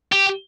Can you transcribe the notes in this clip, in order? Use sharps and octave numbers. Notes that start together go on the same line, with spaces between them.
G4